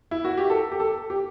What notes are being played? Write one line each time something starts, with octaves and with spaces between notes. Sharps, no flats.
E4
F#4
G4
A4
G4
A4
G4